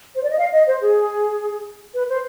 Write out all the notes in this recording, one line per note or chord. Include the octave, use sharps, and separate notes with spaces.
C5
D5
D#5
F5
D#5
C5
G#4
B4
C5